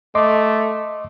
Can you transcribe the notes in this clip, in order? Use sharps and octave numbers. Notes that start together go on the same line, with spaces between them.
A3 D#5 C6 D6